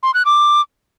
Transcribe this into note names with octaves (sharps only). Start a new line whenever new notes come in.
C6
F#6
D6